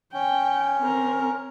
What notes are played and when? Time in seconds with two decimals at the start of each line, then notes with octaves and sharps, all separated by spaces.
0.13 C#4 G5
0.80 C4 A#4